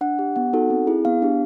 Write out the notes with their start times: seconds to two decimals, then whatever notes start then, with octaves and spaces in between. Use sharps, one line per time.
0.01 D4 F#5
0.19 G4
0.36 B3 F#5
0.53 D#4 F#4 A4
0.70 C4
0.87 E4 G#4
1.05 B3 F5
1.22 D4 G4